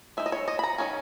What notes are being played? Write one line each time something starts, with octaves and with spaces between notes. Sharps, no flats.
G#3 D#4 E5
D#5
C#5
D#5
B5
A#5
D#3 A#3 C#4